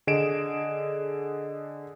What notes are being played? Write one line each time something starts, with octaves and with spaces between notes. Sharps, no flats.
D3 G#4 D#5 D7 E7